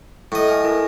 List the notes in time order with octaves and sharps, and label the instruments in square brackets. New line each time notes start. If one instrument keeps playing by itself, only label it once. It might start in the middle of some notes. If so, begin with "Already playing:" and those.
[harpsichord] A2 D#5 [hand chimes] E4
[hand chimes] G#5 F6
E4 A#4